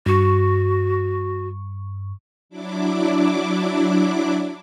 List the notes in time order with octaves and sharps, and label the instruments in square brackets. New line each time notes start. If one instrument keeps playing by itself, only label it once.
[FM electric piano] G2 C#6 [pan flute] F#4
[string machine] F#3 D4 E4 D6